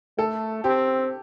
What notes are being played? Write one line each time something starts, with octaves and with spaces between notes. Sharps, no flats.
A3 A4
C4 G4